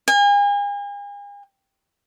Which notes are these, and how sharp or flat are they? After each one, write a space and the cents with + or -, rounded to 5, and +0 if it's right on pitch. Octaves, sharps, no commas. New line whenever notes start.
G#5 -40